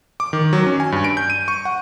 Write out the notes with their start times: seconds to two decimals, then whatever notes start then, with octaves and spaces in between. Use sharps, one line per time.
0.20 D6
0.33 D#3
0.53 F#3
0.67 C#4
0.80 G#5
0.92 G2
1.04 D7
1.17 G6
1.30 D#7
1.48 C#6
1.65 F#5